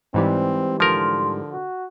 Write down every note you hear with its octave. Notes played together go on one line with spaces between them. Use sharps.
G#2 E3 G3 C4
D3 F3 A#4 C6
F#4